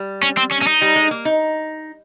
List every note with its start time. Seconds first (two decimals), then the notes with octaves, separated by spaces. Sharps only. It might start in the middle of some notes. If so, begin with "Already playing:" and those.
Already playing: G3
0.23 C#4
0.38 C4
0.52 C#4
0.62 C#4
0.67 D#4
0.82 G3
0.96 G#3
1.11 A#3
1.25 D#4